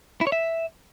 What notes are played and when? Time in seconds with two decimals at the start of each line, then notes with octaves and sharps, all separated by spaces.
0.21 E4
0.27 C#5
0.32 E5